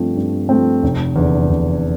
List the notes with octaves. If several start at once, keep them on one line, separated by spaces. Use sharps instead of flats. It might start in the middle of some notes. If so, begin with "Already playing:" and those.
Already playing: G2 F3 A3 C4
G2
F3 A3 C4
F1
E2 D3
F1